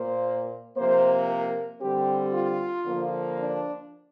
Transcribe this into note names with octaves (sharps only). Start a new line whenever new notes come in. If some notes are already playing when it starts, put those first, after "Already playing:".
Already playing: A#2 A#3 C5
C3 F3 A#3 C5
A#4
D3 G3 C4 G4
F4
D3 F3 A#3
D4